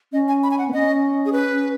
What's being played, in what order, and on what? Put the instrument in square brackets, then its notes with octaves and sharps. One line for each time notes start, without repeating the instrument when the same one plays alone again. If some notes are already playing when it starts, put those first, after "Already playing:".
[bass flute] C#4 [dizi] D#5
[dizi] G#5
B5
G#5
F#5
[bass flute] B3
[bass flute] C#4 [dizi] D#5
[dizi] G#4
B4